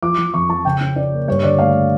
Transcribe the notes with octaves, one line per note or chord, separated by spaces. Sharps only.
F3 D6
F3
F2 C#6
F3 A5
C#3 G5
C#4
C#4 D5
A#3
G2 C#5
D3 D5
A3 F5